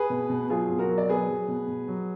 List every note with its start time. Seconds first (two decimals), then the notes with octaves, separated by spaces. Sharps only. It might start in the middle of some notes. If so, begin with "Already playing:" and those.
Already playing: G#4 B4
0.10 B2
0.30 B2
0.50 F#3 F4 G#4
0.69 B2
0.79 F#4 A#4
0.89 F#3
0.98 D5
1.09 B2 G#4 B4
1.29 F#3
1.48 B2
1.68 B2
1.88 F#3